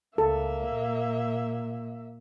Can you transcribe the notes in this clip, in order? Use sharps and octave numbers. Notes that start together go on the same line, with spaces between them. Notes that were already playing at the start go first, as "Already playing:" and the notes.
C#2 A#3 A4 E5
A#2